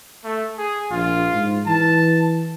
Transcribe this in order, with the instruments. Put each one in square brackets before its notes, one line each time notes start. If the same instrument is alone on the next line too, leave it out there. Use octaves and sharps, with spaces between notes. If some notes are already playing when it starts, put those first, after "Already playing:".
[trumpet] A3
G#4
[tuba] A#1 [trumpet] F4
[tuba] G#2
[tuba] E3 [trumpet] A5